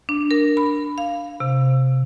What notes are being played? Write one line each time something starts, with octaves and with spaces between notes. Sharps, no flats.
D4
A#4
B5
F5
C3